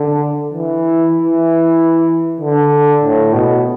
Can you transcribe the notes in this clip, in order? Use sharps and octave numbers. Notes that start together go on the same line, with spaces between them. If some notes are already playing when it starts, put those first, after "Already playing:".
Already playing: D3
E3
E3
D3
A2
B2